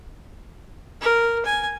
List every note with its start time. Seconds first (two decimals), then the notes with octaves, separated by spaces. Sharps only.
1.01 A#4
1.46 G#5